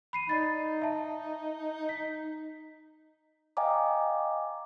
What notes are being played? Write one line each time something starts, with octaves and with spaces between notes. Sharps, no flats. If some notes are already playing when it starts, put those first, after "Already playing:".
B5 C7 D#7
D#4 D5 B5 A6
E5 A5
B6
D#5 F5 G5 G#5 A#5 D6